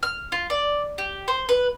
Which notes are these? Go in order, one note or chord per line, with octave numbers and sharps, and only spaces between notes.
F6
F4
D5
G4
C5
B4